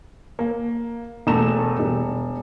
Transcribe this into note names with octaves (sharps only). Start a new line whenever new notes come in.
A#3
E1 A3 A#5 E7
E1 G3